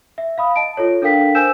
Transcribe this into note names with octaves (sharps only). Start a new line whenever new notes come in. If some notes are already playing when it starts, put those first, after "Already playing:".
E5
F5 B5 D#6
D#5 A5 D7
F4 A4 C#5
D4 A4 A#4 F5 G5 B6
A#4 C5 G#5 E6 G6 E7